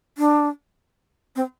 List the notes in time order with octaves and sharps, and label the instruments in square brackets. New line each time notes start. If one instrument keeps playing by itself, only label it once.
[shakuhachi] D4
C4